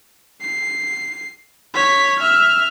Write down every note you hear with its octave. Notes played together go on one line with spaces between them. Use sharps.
C7
C#5 B6
E5 F6